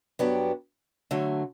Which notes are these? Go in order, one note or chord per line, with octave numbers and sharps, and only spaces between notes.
G2 F#3 B3 D4 G4
D3 F#3 A3